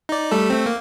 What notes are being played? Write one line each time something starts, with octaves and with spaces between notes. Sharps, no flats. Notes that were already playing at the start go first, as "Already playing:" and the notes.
D#4 D5
G3 A3 A4
A3 C4
A#3